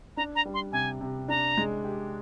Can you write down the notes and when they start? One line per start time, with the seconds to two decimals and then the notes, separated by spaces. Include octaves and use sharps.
0.17 D4 A#5
0.35 A#5
0.45 G3
0.54 C6
0.72 C3 G#5
1.01 C3
1.28 D4 A#5
1.57 G#3
1.84 G4